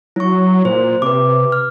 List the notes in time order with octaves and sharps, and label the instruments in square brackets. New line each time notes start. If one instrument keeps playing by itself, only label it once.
[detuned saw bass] F#3 [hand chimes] E4 C#6
[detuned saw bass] A#2 [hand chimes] C5
[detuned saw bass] C3 [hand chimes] B4 D6
[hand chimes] F6